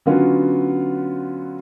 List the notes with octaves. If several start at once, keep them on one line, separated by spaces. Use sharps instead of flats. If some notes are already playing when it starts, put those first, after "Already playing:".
D3 F#3 B3 C#4 F4 F#4